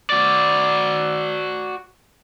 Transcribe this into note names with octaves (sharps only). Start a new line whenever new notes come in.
F#4 D5